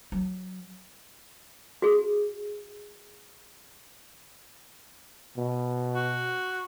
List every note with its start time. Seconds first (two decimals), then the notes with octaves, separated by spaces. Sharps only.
0.12 F#3
1.82 F#4 G#4
5.37 B2
5.95 F#4